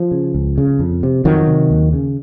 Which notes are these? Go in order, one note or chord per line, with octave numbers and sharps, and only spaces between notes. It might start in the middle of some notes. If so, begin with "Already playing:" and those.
Already playing: F3
C#3
C#2
C#3
F2
C3
F2 D#3 F#3
C3
D#2
C#3